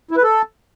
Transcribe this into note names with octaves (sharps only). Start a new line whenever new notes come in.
E4
B4
A4